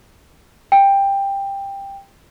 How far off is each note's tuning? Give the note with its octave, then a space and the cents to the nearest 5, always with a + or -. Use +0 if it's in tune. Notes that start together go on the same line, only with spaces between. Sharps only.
G5 +15